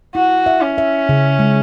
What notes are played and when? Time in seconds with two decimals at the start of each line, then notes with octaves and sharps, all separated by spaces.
0.15 E4 F#4
0.46 E5
0.62 C#4
0.78 E5
1.09 C#3
1.39 G#3